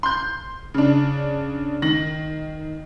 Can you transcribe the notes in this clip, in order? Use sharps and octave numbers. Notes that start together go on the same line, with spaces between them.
C6 G6
C#3 D4
D#3 A#6 F#7